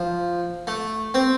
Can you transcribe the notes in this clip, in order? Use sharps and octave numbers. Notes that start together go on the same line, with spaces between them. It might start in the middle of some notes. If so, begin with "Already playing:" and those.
Already playing: F3
A3
C4